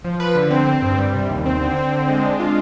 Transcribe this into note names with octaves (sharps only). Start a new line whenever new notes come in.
F3
B4
D3
C4
C4
G2
G3
C3
D#2
C4
D3
C4
D3
G#3
D4
F4